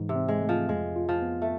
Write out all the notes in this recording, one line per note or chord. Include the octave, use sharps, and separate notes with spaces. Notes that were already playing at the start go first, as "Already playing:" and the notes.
Already playing: G#2 E3
C3
C4
G#3
A3
F3
F2 G#3
F4
F3
B3
A3